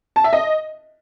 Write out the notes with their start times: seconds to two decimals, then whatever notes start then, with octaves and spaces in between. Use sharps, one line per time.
0.16 A5
0.24 E5
0.33 D#5